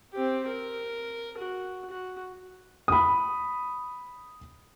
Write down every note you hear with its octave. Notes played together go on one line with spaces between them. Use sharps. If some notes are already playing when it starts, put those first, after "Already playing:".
C4 G4
A#4
F#4
F#4
B5 D#6